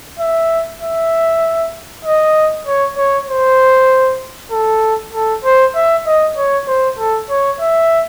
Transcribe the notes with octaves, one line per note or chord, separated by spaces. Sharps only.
E5
E5
D#5
C#5
C#5
C5
A4
A4
C5
E5
D#5
C#5
C5
A4
C#5
E5